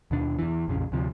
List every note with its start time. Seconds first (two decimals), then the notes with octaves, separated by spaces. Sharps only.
0.11 D#2 B2 D4
0.39 E2 E3
0.68 A#1 F2 C#3
0.92 D2 C3 F3